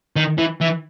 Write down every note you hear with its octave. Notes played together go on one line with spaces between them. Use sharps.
D#3
E3
E3